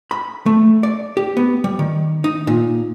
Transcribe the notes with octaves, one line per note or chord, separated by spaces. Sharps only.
B5
A3
D5
G4
B3
G3
D#3
D#4
A#2